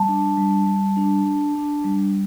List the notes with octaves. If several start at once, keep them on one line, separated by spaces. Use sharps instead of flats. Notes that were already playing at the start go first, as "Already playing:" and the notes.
Already playing: G3 A5
D4
G3
G3
D4
D4
D4
G3